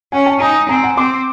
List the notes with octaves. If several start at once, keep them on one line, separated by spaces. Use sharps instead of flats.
C#4 F#5 G#5
G5 A5
D#4 G#5 A#5
C4 G#5 A#5
F#5 G#5
C4 C6 D6